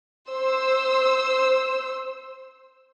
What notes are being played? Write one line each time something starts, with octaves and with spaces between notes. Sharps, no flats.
C5 E6